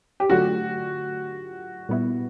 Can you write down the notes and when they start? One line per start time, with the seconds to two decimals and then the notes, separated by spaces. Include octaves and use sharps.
0.20 G4
0.30 D3 F#3 A3 D4 F4 F#4
1.89 A#2 G3 B3 E4